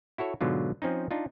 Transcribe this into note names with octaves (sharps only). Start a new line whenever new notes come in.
E4 F#4 A4 C#5
G#2 B2 D3 F#3 F4
F3 C4 C#4 D#4
D4 D#4 F4